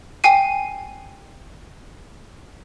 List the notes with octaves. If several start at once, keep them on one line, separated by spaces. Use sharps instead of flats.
G5 G#5 C7 D#7